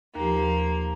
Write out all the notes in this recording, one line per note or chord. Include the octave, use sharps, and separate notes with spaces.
D#2 F3 A#3 G4